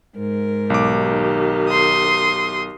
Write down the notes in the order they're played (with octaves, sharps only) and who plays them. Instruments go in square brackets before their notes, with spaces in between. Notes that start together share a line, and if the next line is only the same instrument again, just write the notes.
[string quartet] G#2 A#4
[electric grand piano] B1 D6 [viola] D#3 G4
[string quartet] C6 D#6